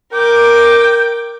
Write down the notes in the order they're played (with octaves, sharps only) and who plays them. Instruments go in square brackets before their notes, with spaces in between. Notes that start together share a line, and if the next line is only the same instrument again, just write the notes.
[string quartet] A#4 D6 [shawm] G5